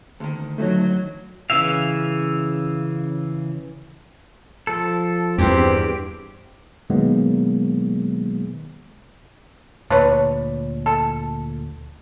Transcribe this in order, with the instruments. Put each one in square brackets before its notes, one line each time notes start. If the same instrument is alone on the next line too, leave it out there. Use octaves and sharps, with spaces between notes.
[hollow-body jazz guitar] D2 D#3
[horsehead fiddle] F#3 [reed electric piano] A3 D#4 C#5
[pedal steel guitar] C#3 E3 E5 F5
F3 A4
[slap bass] E2 G2 [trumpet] C4 [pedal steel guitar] G4
[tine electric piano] B2 D#3 F#3 G#3 A#3 B3
[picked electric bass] D2 A#2 [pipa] D4 B4 C#5
[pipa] A4